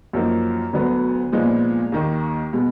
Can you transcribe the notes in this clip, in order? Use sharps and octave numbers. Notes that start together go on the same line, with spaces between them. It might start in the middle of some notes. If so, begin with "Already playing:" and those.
F#2 F3 A#3 D#4
D2 D3 F#3 B3
A#2 F3 G#3 B3 D#4
D#2 D#3 A#3
B2 G#3